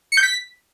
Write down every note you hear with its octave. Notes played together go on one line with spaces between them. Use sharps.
C#7
G6
B6